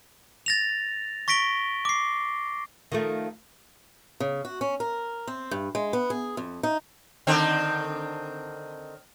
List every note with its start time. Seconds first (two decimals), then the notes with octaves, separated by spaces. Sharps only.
0.46 A6 A#6 F7
1.28 C#6 A#6 B6 D7 G7
1.85 D6 C7
2.92 D#3 F3 A3
4.20 C#3
4.45 F#4
4.61 C#4
4.80 A#4
5.27 C4
5.51 G2
5.75 G#3
5.93 B3
6.10 G#4
6.37 F2
6.63 D#4
7.27 D3 D#3 C4